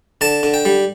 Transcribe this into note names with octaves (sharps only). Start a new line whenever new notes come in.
D3 A5
D3
G5
G3